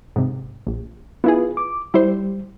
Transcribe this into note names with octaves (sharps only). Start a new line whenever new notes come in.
G#2 C3
A#1
B3 E4 F4 G#4 B4
D6
G3 E4 C5